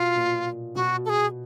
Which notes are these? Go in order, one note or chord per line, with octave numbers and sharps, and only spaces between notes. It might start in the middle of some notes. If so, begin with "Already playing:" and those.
Already playing: B2 F4
A#2
B2 F#4
A4
G#4